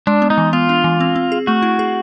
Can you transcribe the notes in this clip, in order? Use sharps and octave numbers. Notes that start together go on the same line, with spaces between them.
G#3 D4
B3
D#4
E3
B3 F4
D4
E3
C4
C4
G#4
A3 F#4
E4
G#4